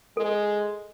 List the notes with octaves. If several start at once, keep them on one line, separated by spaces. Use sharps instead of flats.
G#3 A4